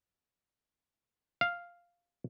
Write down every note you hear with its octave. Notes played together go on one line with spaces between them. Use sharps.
F5